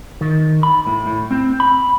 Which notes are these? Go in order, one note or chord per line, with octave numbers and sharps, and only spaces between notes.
D#3
B5
A2
A2
C4
B5